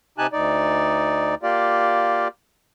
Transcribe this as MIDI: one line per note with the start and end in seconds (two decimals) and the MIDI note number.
0.18 0.27 48
0.18 0.27 63
0.18 0.27 67
0.18 0.27 80
0.18 0.27 81
0.18 0.27 90
0.32 1.35 38
0.32 1.35 63
0.32 1.35 74
1.43 2.28 58
1.43 2.28 65
1.43 2.28 67
1.43 2.28 74